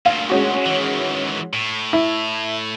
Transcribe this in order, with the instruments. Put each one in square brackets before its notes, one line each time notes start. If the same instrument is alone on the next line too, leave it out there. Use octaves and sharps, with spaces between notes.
[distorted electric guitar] D2 A#2 [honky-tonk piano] F5
[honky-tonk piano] G#3 C#4 F#4
[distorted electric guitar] D#3 E3
A2
[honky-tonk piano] E4